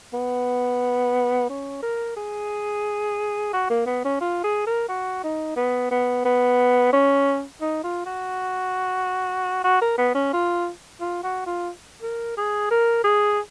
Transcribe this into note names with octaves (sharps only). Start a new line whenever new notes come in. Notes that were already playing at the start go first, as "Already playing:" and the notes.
B3
C#4
A#4
G#4
F#4
A#3
B3
C#4
F4
G#4
A#4
F#4
D#4
B3
B3
B3
C#4
D#4
F4
F#4
F#4
A#4
B3
C#4
F4
F4
F#4
F4
A#4
G#4
A#4
G#4